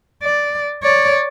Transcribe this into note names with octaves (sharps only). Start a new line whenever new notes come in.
D5
C#5 D5